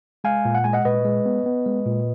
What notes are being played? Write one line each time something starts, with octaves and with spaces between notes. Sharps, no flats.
G#3 F5 G#5
A#2
F#5
G#3 G#5
D#5 F#5
A#2 B4 D#5
G#3
B3
B3
G#3
A#2